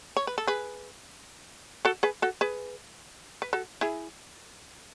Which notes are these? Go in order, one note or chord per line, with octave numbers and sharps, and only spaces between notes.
C#5
B4
A4
G#4 B4
F#4 A4
G#4 B4
F#4 A4
G#4 B4
B4
F#4 A4
E4 G#4